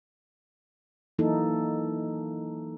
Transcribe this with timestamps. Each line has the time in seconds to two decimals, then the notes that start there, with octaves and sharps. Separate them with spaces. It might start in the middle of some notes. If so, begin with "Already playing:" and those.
1.19 E3 F#3 A#3 D#4 E4 A4